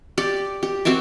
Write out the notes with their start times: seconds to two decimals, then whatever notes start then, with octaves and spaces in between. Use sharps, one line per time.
0.18 G4 D5
0.63 G4
0.85 C4 F#4 E5 D6